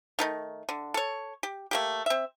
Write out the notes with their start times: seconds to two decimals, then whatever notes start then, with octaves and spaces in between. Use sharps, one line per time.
0.19 D#3 A3 D#4
0.69 D3
0.94 A4 C#5
1.43 G4
1.71 A3 A#3 G4
2.06 C4 E5